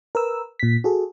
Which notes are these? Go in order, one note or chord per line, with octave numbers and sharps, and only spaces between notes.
A#4 B4 E6
A#2 B6
F#4 G#4 A4